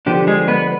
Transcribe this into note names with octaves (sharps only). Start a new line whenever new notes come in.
D3 F3 B3 D4 G4
G#3 G#4
B3 B4